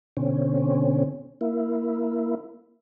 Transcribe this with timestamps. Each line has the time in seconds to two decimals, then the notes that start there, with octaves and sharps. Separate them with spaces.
0.17 B2 D3 C4 C#4
1.41 A#3 E4